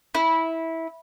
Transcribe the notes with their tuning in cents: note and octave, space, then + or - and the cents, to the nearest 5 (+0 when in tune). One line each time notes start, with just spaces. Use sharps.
E4 -15